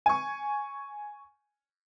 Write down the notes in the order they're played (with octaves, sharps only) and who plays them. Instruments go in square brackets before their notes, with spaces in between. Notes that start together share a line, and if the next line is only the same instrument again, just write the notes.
[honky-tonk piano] G#5 C#6